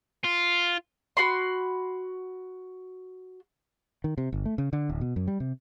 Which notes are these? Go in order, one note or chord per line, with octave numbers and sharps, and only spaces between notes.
F4
F#4 B5 C6
D#3
C3
G1
A3
C#3
D3
D1
B2
F#2
G3
C3